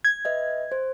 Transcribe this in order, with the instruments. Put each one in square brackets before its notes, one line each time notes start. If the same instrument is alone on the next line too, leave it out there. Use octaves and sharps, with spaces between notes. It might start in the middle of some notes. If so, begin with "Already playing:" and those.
[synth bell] G#6
[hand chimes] B4 D#5 E5
C5